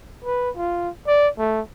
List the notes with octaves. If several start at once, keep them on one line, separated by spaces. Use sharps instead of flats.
B4
F4
D5
A3